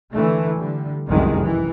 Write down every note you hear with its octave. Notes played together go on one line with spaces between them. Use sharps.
D3 E3 A3
D3 G3
F1 C2 F#2 D#3 E3 G#3
E3